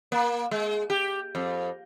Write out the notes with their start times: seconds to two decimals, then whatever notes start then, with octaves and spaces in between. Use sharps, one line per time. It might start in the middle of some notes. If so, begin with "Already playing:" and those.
0.12 A#3
0.51 G#3
0.90 G4
1.35 F2